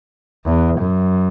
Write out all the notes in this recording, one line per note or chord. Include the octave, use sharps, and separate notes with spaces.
E2
F#2